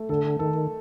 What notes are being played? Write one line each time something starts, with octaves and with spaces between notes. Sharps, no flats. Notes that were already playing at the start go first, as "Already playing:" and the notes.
Already playing: A3
D3 A4
D#3 A4